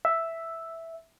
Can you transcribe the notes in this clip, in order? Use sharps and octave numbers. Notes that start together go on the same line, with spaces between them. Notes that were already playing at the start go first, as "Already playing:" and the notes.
E5